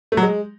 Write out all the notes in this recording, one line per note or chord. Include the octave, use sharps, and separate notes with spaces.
A3
F#3
G#3